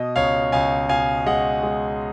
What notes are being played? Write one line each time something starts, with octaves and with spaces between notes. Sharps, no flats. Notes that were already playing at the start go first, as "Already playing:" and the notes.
Already playing: B2 D#5
C#2 C#5 F5
C#2 F5 G#5
B2 F5 G#5
G#3 D#5 F#5
G#3